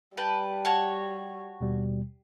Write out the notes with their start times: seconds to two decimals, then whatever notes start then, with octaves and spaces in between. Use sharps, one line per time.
0.17 G3 G4 B4 A5
0.65 F#4 C#5 A5
1.61 D#2 B2 G3